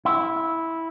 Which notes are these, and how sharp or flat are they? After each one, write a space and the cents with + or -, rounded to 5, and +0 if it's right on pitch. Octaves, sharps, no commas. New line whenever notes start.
E4 -10